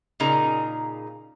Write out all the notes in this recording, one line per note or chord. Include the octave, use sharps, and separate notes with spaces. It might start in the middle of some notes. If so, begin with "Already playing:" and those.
A#2 C#3 D#4 G#4 A#4 A#5